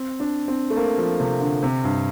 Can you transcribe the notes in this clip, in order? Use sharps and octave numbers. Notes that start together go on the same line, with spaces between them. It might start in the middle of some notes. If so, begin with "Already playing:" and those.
Already playing: C4
D4
C4
A3
A#3
F3
C3
D3
C3
G2